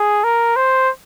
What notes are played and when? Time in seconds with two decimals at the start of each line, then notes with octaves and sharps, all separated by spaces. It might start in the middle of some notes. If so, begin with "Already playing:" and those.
Already playing: G#4
0.24 A#4
0.56 C5